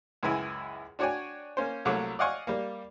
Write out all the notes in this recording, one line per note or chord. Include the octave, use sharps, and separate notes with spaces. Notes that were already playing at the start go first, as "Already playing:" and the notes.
C#2 F#2 E3 E4 G#5
D4 F#4 C#5 D5 G5 G#5
A#3 C#4 C5
C2 F#3 A3 A#3 D6
D5 D#5 F5 F#5 G#5 C#6
G3 A#3